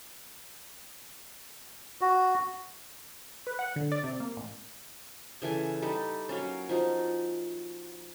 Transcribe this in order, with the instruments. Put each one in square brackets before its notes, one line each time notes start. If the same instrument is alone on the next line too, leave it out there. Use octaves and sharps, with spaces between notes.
[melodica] F#4
[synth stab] B4
F#5
D3
D5
C3
A#3
A1
[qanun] C#3 E3 A4 G#5
G3 D#4 A4
F#3 A#3 C#4
F3 D#4 F#4